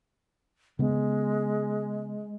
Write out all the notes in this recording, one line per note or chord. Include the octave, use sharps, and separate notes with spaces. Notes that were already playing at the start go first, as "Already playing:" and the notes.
C#3 G#3 B3 C#4